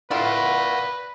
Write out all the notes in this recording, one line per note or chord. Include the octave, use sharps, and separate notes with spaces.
A3 E4 F4 B4 D5 F5 F#5